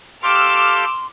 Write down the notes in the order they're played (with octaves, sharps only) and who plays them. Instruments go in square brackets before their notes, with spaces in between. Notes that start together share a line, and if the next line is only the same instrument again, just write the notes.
[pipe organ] G4 A4 F5 [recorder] C6 [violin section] D6 E6 F6